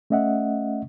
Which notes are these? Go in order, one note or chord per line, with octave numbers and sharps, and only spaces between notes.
A3 C#4 D#5 E5 F#5